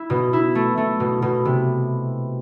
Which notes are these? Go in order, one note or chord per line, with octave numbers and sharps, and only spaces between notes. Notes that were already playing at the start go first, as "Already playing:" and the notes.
Already playing: E4
B2
E4
A3
A3
B2
B2
C3